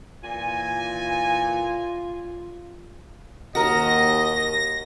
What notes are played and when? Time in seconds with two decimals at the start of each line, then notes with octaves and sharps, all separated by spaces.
0.24 A#2 E3 F4 G#5
3.55 D#2 F#4 A#4 D#5 A#6